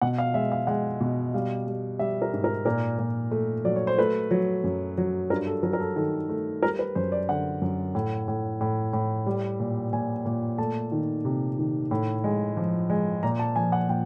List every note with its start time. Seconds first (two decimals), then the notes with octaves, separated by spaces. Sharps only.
0.02 B2 F#5
0.18 F5
0.34 G#3 E5
0.52 F5
0.67 G#3 F#5
1.00 B2
1.34 G3 F5
1.67 G3
1.99 G3 E5
2.22 A#4
2.33 G#2
2.44 A#4
2.66 A#2 A#4
2.99 A#2
3.31 A3
3.65 F#3 D5
3.76 C#5
3.87 C5
3.98 A3 B4
4.31 F#3
4.64 F#2
4.98 F#3
5.30 G2 A#4
5.47 A4
5.63 F#3 A#4
5.73 A#4
5.80 A4
5.96 D#3 A4
6.29 A3
6.63 G3 A#4
6.79 B4
6.95 F#2 C5
7.12 D5
7.29 D3 F#5
7.62 F#2
7.95 A2
8.28 A2
8.61 A2
8.93 A2
9.26 G3
9.60 A#2
9.93 A#2 G#5
10.26 A#2
10.58 A3 A5
10.92 D#3
11.25 C3
11.58 D#3
11.91 A2
12.24 G#3
12.57 F3
12.90 G#3
13.23 A#2 A#5
13.39 A5
13.56 F3 G#5
13.72 F#5
13.89 A#2 G5